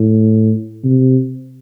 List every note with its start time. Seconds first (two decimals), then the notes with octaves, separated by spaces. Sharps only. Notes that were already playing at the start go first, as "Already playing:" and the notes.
Already playing: A2
0.84 C3